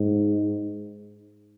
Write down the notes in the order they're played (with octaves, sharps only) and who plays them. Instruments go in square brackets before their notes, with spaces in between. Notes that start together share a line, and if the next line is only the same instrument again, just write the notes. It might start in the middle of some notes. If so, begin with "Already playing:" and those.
Already playing: [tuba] G#2